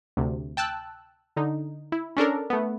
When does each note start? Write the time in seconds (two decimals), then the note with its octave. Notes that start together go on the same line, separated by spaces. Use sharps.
0.17 D2 C3
0.57 G5 A5 E6 F#6
1.36 D3 D#4
1.92 E4
2.17 C#4 D4 A4 A#4
2.50 A3 B3